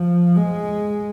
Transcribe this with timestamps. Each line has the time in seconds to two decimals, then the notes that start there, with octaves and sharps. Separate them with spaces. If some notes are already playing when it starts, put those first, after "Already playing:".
Already playing: F3
0.36 G#3